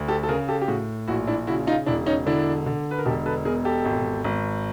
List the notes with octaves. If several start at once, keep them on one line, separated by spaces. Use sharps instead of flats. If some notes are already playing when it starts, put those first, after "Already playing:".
Already playing: D2
G4 A4
A4
C#3 G#4 A#4
G4 A4
G4
A2 F#4 G#4
A#1 E4 F#4
D4 E4
C#3 E4 F#4
D#4 F4
E1 D4 E4
C#4 D#4
D3 D4 E4
D3
B4
A#4
E1 G4 A4
A4 B4
E2 G#4 A#4
G4 A4
G#1
G#1